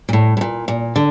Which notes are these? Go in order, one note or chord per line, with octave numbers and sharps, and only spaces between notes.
A#2
A2
A2
A#2
A#2
D3